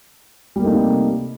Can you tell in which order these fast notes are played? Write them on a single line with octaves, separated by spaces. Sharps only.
G3 A#3 A3 D#4 C3